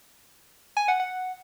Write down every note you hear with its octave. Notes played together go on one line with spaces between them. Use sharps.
G#5
F#5
F#5